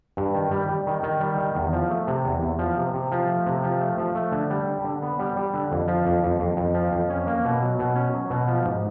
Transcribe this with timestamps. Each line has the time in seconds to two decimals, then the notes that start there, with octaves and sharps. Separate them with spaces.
0.17 G2
0.34 D#3
0.51 G3
0.69 G3
0.87 D#3
1.03 D#3
1.20 G3
1.38 D#3
1.55 E2
1.73 F3
1.90 A3
2.07 C3
2.25 E2
2.43 E2
2.59 F3
2.77 C3
2.93 C3
3.12 F3
3.28 A3
3.46 C3
3.63 F3
3.81 A3
3.98 F3
4.15 A3
4.32 D3
4.50 G3
4.68 D4
4.84 D3
5.02 B3
5.19 G3
5.36 G3
5.54 D3
5.72 F2
5.88 F3
6.06 F2
6.23 F2
6.40 F2
6.57 F2
6.74 F3
6.92 F2
7.10 C#4
7.27 A#3
7.45 B2
7.62 F#3
7.79 B2
7.96 C#4
8.14 F#3
8.30 B2
8.48 F3
8.65 G#2